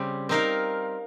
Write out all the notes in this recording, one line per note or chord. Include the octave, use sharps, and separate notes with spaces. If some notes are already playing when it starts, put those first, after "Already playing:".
Already playing: C#3 G3 C4 G4
C4 D#4 A#4 F5